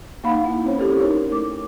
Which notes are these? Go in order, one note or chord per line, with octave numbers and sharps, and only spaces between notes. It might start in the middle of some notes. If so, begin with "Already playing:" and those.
A#3 D#4 F5 F#5 B5
E4
C4 C#4 C5 C#5
E4 G4 A4 A#4
D#4 A#4 C#5
A3 D6